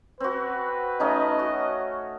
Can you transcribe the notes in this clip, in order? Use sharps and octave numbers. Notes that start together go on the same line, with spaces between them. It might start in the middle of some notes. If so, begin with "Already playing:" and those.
C4 F#4 B4
A3 C#4 D#4 D#5
F#4